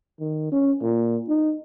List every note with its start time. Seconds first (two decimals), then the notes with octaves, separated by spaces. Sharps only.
0.20 D#3
0.51 C#4
0.82 A#2
1.28 D#4